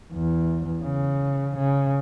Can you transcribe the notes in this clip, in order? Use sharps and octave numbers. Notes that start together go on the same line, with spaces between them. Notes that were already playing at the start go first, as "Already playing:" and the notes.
E2
C#3
C#3